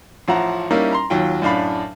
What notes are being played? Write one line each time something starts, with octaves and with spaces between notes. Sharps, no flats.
A1 F3 F#5 A#5
G3 A#3 C#4 D#4 E4 A#4
A#5 C6
D#2 F#3 F4 G5
F#2 A2 D4 F5 B5